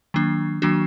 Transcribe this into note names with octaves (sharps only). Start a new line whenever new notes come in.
D#3 F#3 A#3 D4
D#3 F#3 A#3 D4 F#4